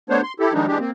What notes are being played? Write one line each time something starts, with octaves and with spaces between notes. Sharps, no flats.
A3 B3 D4 C5 C#5
C6
E4 G4 A4
D#3 F3 G3 G#3 D4 D#4
E3 G#3 D4 G4
A#3 C4